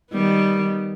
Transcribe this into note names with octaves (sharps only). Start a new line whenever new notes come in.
D#3 G3 B3